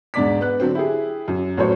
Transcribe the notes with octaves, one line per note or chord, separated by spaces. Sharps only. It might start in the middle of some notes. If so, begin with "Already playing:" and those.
E1 G#2 D4 D5 D6 B6
B3 F#6
D3 F#3 C4
E4 G4 G#4
F#2
A1 A2 F#3 C5 C#5